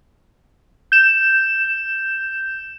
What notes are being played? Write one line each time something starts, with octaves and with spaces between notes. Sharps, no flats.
G6 E7